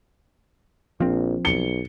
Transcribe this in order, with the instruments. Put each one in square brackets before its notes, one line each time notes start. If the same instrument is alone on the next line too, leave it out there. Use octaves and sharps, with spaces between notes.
[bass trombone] A#1 [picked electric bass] F3 C4
[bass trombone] B1 [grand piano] C#7 G7